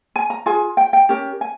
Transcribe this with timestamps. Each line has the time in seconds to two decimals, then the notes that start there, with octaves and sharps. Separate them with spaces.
0.16 G#5
0.30 A#5
0.46 F4 G#4 G#5
0.77 G5
0.93 G5
1.09 C#4 G4 A#4
1.41 G#5